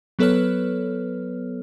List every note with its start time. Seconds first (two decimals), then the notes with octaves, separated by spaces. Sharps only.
0.19 F#3 B3 A4 B4 C#5 F6